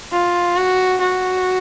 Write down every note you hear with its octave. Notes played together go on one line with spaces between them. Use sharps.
F4
F#4
F#4